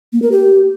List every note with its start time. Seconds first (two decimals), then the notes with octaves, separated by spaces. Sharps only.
0.13 A#3
0.22 A#4
0.32 G4